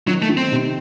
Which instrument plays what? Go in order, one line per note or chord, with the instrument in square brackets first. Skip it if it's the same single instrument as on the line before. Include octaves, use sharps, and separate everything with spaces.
[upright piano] D#3 [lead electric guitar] F#3
[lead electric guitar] A3
[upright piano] D#3
[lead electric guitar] C4
[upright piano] C3